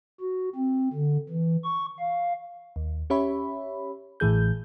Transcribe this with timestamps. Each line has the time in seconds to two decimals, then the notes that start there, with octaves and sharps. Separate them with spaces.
0.21 F#4
0.55 C4
0.93 D3
1.29 E3
1.64 C#6
1.99 F5
2.76 D#2
3.10 C#4 G4 C#5 E5 B5
4.20 A1 A2 E3 G#4 G6